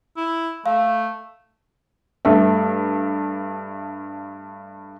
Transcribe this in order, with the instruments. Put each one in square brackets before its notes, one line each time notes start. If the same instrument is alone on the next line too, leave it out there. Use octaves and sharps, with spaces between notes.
[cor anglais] E4
[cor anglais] A3 [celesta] F5
[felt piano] G2 A3 E5